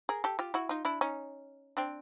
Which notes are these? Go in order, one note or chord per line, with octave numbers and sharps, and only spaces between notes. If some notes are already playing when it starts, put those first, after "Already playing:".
G#4 A#4
G4 A4
F4 G4
E4 F#4
D#4 F4
D4 E4
C#4 D#4
C4 D4